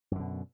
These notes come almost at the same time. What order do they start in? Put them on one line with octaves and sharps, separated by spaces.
F#2 D3 B2